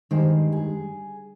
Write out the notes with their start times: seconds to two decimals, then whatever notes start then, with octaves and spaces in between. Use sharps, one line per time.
0.11 G2 D#3 G#3 C5
0.52 G#4